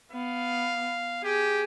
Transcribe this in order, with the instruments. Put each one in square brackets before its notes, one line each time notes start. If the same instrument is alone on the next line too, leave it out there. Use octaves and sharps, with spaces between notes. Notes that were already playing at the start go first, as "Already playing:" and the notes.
[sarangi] B3 [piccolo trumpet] F5
[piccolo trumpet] G4 [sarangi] G#4